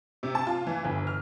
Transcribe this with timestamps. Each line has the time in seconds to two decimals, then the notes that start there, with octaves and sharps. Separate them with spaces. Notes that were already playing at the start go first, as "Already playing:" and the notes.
0.23 C3
0.35 A5
0.47 F4
0.67 E3
0.85 G1
1.07 F6